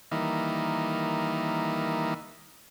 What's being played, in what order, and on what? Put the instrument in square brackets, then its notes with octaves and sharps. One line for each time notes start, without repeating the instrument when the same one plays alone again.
[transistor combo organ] D#3 E3 G3 A#3 D#4 E4